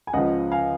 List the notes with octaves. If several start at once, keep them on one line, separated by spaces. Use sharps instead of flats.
G#5
C#2 C#3 F3 D#5 F#5
F5 G#5